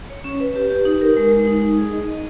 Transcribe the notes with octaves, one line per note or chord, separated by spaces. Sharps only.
C#5
C#4
B4
G4
G4
D#4
A#4
G#3
G#3
D#4
D#4
G#4
D#5
D#5